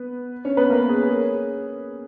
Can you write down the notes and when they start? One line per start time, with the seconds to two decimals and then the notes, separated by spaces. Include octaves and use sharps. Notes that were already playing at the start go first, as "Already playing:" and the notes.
Already playing: B3 B4
0.45 C#4 C#5
0.57 B3 B4
0.70 A#3 A#4
0.89 G#4
1.09 G#4